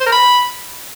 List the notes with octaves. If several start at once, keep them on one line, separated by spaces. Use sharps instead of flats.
C5
A#4
B5